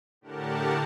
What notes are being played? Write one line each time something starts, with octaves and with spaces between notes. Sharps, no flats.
A2 D3 G4 A#4 F#5 A5